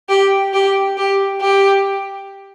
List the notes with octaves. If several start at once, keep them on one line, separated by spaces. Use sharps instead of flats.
G4
G4
G4
G4